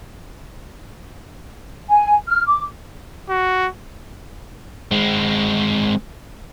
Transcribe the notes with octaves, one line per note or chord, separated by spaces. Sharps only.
G#5
F6
D6
F#4
G#3 C4